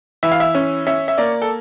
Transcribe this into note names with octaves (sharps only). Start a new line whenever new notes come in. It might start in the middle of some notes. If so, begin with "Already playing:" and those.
E3 E5
F5
E5
C#4
C#4 E5
E5
A#3 D5
A4